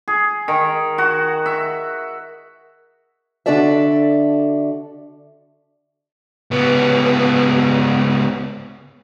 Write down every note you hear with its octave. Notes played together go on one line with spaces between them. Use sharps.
G#4
D#3
F#4
E5
D3 D4 F#4 A4 D5 E5
C#2 B3